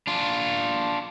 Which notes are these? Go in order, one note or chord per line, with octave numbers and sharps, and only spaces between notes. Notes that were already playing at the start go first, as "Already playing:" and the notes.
D4 F4